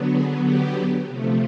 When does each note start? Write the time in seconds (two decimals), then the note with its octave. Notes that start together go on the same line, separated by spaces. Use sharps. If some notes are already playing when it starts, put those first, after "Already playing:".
Already playing: D3 F#3 B3
0.13 G#4
0.44 G4
1.07 C3 F3 A3